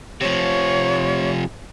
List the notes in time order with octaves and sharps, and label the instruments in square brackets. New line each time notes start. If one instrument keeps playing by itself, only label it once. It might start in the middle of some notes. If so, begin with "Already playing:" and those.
[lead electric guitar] C3 F3 [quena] C#5